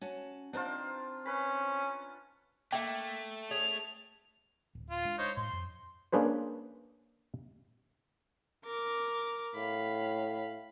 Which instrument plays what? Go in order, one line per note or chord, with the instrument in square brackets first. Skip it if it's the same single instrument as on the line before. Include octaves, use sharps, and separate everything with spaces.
[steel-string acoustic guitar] C#4 F#4 A5
[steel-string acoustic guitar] C4 C5 D5 [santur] D4 D#4 F4
[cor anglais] C#4 [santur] B4 B5
[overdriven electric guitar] A3 [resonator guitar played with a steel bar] A#3 E5 [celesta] G5
[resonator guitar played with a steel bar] G#4 C#5 [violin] F7
[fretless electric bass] D1
[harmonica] F4
[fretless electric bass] G#3 D4
[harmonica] D#4 C5 C#5
[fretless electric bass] A2 [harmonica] C6
[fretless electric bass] F2
[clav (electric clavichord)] A#3 C#4 D4 G#4 B4 C5
[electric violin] A#4 D6
[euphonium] A2 [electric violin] F5 B5